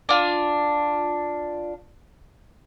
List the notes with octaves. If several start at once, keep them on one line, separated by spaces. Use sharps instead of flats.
D4 F4